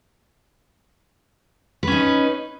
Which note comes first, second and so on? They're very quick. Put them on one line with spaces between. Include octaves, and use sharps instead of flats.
B4 C#4 D#4